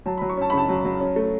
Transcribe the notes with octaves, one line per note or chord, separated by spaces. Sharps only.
F#3 A5
F#3 B5
C#6
C#4 A5
B5
C#3 A5
F#3
F#3
C#4
A3